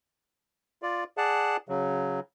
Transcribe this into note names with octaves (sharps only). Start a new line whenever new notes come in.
F4 D5
G#4 D5 F#5 A5
C#3 F#3